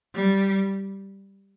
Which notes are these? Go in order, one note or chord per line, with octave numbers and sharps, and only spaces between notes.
G3